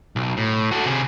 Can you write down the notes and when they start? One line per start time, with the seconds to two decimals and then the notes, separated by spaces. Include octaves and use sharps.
0.16 B1
0.37 A2
0.71 F#4 A4
0.86 C3 G#4